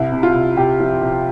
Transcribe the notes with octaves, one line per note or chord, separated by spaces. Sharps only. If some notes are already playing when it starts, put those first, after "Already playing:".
Already playing: C2 E4
C3
F4
C2
C3 G4
F3
C3